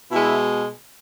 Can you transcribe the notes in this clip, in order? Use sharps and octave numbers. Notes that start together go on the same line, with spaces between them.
B2 G#3 E4